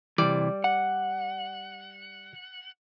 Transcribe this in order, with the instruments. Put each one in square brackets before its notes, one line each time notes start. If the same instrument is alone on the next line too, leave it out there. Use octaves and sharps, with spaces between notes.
[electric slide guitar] C3 E3 [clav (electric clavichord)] G3 D5
[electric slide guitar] F#5